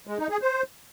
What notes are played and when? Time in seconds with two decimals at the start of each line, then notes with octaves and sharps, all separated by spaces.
0.07 G#3
0.19 D#4
0.30 G#4
0.42 C5